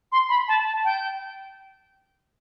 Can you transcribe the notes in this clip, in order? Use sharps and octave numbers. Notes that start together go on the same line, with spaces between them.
C6
B5
A5
A5
G5